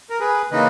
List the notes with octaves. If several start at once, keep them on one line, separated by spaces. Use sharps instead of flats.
A#4
G#4 B4
C#3 E3 A#3 D#4 B4 D#5